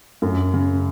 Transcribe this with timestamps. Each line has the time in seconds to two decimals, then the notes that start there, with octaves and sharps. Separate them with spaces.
0.22 F#2
0.54 C#3